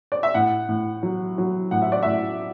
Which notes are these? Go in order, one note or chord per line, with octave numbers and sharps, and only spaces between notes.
D5
E5
A2 F#5
A2
F#3
F#3
A2 F#5
E5
D5
A2 E5